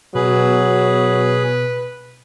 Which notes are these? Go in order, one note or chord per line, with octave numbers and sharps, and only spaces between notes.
B2 F#3 G#4 B4